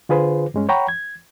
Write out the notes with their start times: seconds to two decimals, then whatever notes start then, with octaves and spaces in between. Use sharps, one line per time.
0.09 D3 F4 G#4 B4 C5
0.54 G2 G#3 C#4
0.69 C#5 F#5 G5 A#5 B5 C#6
0.88 G#6